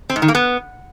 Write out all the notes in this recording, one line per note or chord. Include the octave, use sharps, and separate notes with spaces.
C4
G#2
D#3
A#3
B3